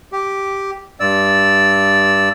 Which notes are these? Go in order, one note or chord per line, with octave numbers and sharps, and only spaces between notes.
G4
G2 D5 E6